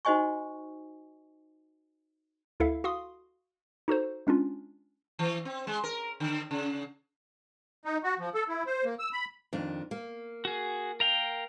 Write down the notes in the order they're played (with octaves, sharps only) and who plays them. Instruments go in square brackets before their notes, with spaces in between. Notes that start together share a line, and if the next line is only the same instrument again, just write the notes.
[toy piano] D#4 F#4 C5 D#5 G#5 C#6
[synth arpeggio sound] D2 E4 A4 E5 F5
F#4 F5 C6 D#6
D#4 F#4 A4 C5
G#3 C#4 D4 F4
[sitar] E3
C4
G#3
A#4
D3
C#3
[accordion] D#4
F#4
F3
A4
E4
C5
A#3
E6
B5
[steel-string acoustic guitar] F2 D#3 D4
A#3
[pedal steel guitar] F#4 G#4
A#4 F5 G5